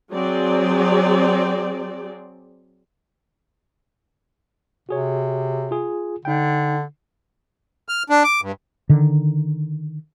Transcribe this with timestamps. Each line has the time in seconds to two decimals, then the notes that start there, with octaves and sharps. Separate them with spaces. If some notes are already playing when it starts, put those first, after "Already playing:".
0.12 F#3 C4 G#4 D5
4.89 C3 F#4 G#4 C#5
5.71 F4 G#4
6.25 D3 D#4 G5
7.89 F6
8.10 D4
8.24 D6
8.42 G2
8.89 D3 D#3